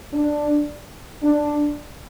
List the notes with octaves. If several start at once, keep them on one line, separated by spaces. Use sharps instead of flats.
D4
D4